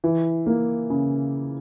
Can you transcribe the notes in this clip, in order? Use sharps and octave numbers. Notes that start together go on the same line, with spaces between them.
E3
A#3
C#3